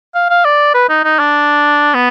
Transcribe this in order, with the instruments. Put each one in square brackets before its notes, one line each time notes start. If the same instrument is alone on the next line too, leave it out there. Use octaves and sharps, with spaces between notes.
[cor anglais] F5
F5
D5
B4
D#4
D#4
D4
B3